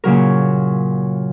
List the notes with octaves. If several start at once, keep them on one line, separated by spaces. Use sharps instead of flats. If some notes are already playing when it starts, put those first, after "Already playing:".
A#2 C#3 F#3 A#4